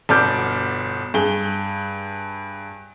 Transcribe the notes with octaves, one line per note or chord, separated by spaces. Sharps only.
G1 B2 D5 D6 F6 G6
G2 G#4 G7